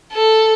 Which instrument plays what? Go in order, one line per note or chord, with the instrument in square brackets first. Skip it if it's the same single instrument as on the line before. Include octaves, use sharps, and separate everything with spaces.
[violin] A4